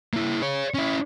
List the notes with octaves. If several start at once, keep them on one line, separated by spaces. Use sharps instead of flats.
A#3 E4
G#4 C#5
C#4 E4